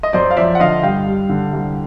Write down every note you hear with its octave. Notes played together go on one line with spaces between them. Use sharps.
D#5
F#2 C5 D5
F5
F3 D5 E5
F#5
D3 D#5 F5
G2 F5 G5
G3
D3
C2